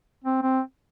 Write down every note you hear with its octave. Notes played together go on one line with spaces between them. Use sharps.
C4
C4